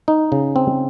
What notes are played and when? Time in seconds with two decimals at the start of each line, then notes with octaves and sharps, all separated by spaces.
0.08 D#4
0.32 C#3
0.56 C4